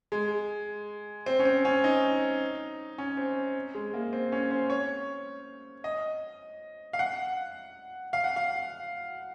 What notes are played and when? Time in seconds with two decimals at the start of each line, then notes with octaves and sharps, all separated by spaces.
0.12 G#3
1.26 C4
1.39 C#4
1.45 C4
1.65 C#4
1.84 D#4
2.98 C#4
3.17 C4
3.75 G#3
3.94 A#3
4.13 C4
4.32 C#4
4.51 C5
4.70 C#5
5.84 D#5
6.93 F5
6.99 F#5
8.13 F5
8.24 F#5
8.36 F5